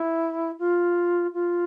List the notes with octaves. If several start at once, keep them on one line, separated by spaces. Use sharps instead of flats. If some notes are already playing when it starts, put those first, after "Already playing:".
Already playing: E4
F4
F4